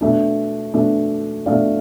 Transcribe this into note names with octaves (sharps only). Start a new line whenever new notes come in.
B2 A3 D4
B2 A3 D4
B2 A3 D4 D5 F5